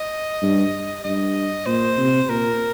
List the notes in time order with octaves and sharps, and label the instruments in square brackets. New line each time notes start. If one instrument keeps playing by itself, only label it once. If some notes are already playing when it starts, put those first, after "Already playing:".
Already playing: [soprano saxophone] D#5
[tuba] G2
[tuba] G2 [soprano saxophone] D#5
[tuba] A#2 [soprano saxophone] C5
[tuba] C3
[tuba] A#2 [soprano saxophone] A#4